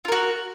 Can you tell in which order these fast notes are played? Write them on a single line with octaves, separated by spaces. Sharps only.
F4 A#4 F#4